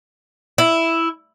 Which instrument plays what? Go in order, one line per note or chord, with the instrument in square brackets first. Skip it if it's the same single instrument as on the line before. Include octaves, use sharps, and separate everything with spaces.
[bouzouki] E4